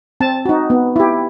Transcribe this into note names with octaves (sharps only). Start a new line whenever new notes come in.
C4 A5
D#4 F#4
B3
E4 G4